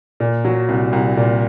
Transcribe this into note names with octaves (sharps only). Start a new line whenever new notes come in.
A#2
F#3
C2
C2
A#2